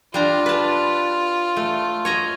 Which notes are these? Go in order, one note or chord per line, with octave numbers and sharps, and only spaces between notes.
G3 D4 F4 A#5
B4 A5
A3
C#5 D#5 A#5